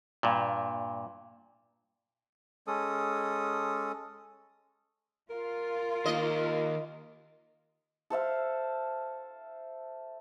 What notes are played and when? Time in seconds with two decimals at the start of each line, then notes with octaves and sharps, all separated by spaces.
0.23 G2 A#2
2.67 G#3 C#4 A4 D#6
5.30 F4 A#4
6.06 D#3 A#3 D#5
8.10 A4 C5 E5 F5